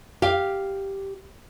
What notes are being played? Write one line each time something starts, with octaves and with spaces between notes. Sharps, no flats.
G4 F5